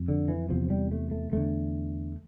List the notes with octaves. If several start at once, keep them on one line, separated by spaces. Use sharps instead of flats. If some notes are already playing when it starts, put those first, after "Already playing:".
Already playing: F2
D3
E3
E2 C3 F3
G3
A3
A3
E2 D3 A3